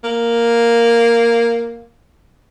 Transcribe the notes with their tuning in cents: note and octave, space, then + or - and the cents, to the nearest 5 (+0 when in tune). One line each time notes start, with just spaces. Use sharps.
A#3 +0